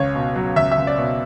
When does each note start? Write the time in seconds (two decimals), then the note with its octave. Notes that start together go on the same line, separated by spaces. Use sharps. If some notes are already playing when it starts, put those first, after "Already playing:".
Already playing: C#2 C#5
0.15 B2
0.36 F#3
0.56 C#2 E5
0.71 E5
0.78 C#2
0.87 D5
0.98 B2